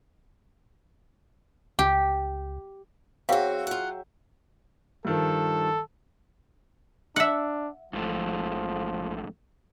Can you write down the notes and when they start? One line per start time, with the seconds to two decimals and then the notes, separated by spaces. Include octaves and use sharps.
1.79 C#2 G4
3.29 F#3 C4 F#4 G#4 E5 F5 G5
3.67 F4 F#5
5.05 G2 D#3 F3 A4
7.16 D4 E5 F#5
7.93 A1 F2 G#2 F3 A3